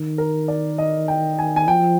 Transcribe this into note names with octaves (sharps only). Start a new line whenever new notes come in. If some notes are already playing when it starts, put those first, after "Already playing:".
Already playing: D#3
A#4
D5
D#5
G5
G#5
G#5
F3 G5